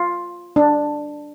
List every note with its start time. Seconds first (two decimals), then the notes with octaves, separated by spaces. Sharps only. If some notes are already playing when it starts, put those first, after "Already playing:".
Already playing: F4
0.56 D4